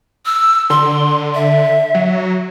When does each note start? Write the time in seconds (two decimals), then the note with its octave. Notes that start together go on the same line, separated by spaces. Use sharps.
0.26 E6
0.70 D3 C6
1.35 E5
1.94 F#3